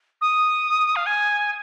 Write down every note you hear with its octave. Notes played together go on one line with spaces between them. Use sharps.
D#6
F5
G#5